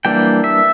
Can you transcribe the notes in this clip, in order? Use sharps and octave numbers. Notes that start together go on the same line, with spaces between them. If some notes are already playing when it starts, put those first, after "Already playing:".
E3 G3 A#3 D4 G5
E5